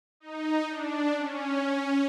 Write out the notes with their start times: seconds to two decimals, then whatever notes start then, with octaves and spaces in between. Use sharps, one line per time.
0.20 D#4
0.69 D4
1.18 C#4